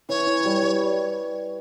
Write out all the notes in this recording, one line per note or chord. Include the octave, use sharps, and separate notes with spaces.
E3 C#5
E3
G3
G3